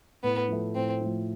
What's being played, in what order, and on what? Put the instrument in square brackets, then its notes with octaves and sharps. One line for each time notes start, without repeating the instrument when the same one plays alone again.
[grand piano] A2 [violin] B3
[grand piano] F3 A3
[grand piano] A2 [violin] C4
[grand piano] F3 A3